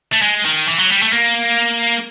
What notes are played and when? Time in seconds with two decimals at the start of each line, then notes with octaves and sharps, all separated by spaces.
0.12 A3
0.21 G#3
0.45 D#3
0.68 E3
0.79 F#3
0.91 G3
1.02 A3
1.13 A#3